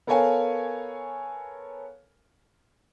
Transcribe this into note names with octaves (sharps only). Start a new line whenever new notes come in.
B3 A4 A#4 C#5 F5 G#5